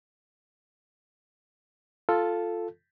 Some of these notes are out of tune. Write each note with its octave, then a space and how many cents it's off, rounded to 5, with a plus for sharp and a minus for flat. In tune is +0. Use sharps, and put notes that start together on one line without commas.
F4 +0 A4 +0